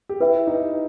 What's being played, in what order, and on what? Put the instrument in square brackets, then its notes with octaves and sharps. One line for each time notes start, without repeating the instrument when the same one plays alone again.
[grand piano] G4
[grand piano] E4 [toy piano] B4 E5 G5
[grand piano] D#4